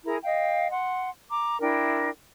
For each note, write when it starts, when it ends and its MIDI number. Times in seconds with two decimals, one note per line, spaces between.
0.04 0.17 64
0.04 0.17 68
0.04 0.17 70
0.04 0.17 82
0.24 0.70 75
0.24 0.70 77
0.24 0.70 79
0.71 1.09 78
0.71 1.09 84
1.30 1.59 82
1.30 1.59 86
1.60 2.09 62
1.60 2.09 64
1.60 2.09 70
1.60 2.09 79